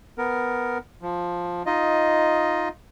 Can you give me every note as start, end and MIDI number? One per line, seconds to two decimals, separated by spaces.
0.18 0.78 59
0.18 0.78 70
1.02 1.63 53
1.66 2.69 63
1.66 2.69 65
1.66 2.69 75